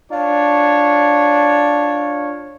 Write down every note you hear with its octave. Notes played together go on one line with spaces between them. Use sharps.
D4 F4 C#5